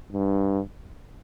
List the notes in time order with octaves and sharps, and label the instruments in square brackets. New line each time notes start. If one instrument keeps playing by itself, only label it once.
[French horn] G2